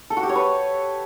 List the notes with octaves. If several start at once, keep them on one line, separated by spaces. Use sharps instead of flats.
A4
F#4
G4
C#5
B4